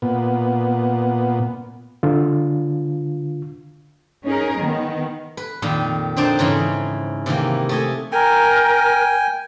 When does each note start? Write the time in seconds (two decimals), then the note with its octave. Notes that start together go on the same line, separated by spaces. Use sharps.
0.02 A#2 B3
2.03 D3 F4
4.25 C#4 D#4 G#4 A#4
4.58 D#3 B3
5.37 B4
5.62 F2 A#2 D#3
6.17 D3 C4 D4 D#4 C5 D5
6.39 G#2 C#3 E3
7.26 C3 D#3 E3 A#3
7.69 A3 D#5 G#5
8.12 A#4 G5 G#5